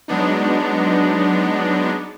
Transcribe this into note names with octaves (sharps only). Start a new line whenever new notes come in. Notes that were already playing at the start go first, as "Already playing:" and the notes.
F#3 G#3 B3 D4 D#4